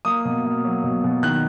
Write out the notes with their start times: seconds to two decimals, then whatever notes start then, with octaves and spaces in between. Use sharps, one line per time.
0.05 A#3 D#6
0.25 B2
0.45 A#3
0.64 F#3
0.84 B2
1.04 B2
1.23 D#3 F#6